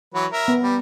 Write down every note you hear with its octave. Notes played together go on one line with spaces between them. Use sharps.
E3 F#3 B4
A#4 E5
B3
G3